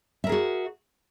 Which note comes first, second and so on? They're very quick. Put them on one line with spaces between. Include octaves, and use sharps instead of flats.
E5 A#4 G#4 F#4